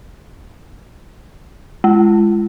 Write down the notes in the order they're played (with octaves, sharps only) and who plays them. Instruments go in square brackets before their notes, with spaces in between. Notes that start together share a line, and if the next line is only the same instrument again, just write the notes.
[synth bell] G#3